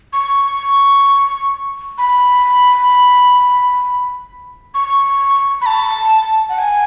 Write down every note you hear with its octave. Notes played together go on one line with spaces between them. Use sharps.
C#6
B5
C#6
B5
A5
F#5
G#5